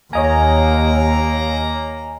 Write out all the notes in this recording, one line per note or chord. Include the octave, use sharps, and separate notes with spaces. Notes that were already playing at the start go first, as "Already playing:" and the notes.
D#2 A#3 C#5 D#5 G#5 A#5